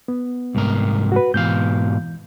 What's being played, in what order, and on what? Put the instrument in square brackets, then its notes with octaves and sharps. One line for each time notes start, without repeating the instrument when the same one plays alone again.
[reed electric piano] B3
[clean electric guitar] C2 G#2 A#4
[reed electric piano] F#4 B4
[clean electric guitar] G#2 B2 F5 [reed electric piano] E3 G6